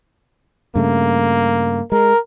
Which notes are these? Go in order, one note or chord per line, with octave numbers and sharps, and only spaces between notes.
G2 C#3 A3 A#3
G#3 A#4